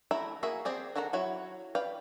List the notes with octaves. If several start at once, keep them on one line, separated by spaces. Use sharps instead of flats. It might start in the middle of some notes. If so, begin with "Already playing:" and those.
A3 E4 E5 A#5
A#3 F#4 G#4 E5
C4 G4 G#4 D5
D#3 F#4 A4 F#5 A#5
F#3 E4 F#4 C#5
B4 D5 F5 G5